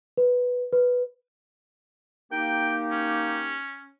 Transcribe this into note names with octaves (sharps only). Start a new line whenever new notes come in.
B4
B4
A#3 D#4 G4 G5
C#4